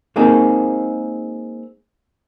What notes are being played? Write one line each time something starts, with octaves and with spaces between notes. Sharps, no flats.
G#3 A#3 C4 D#4 G#4